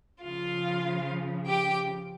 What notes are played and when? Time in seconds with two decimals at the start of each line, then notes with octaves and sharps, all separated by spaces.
0.23 C#3 F3 F4 F5
1.47 G4 G5